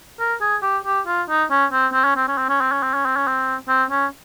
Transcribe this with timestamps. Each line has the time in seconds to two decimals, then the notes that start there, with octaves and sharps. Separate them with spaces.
0.19 A#4
0.41 G#4
0.62 G4
0.85 G4
1.07 F4
1.29 D#4
1.50 C#4
1.71 C4
1.93 C4
2.04 C#4
2.16 C4
2.28 C#4
2.38 C4
2.49 C#4
2.61 C4
2.72 C#4
2.83 C4
2.94 C#4
3.05 C4
3.16 C#4
3.27 C4
3.68 C4
3.91 C#4